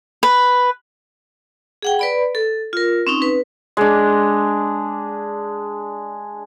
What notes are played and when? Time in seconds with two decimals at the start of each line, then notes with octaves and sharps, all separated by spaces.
0.23 B4
1.82 G#4 F#5 G5
1.99 B4 D5 B5
2.35 A4
2.73 F4 A#4
3.07 C4 C#4 D#4
3.22 B4
3.77 G#3 D4